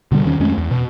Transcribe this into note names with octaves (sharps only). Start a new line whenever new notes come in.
B2 D3 G3
E2 D#3 C#4
F2 G#3 A3 C#4
E2
B2